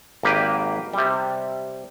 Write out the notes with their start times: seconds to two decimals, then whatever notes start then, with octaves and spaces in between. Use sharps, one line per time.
0.23 G#1 A#3 G4 B4
0.93 C3 G3